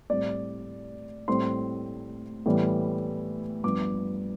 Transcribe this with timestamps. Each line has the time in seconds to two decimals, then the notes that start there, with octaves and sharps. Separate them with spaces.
0.10 A2 G3 C4 D5
1.28 A2 G3 C4 C6
2.46 A2 E3 G3 B3
3.64 G2 F3 B3 D6